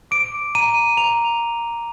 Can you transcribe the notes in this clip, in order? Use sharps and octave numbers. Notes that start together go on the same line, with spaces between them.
D6 D7
A#5 D#7
A#5 F7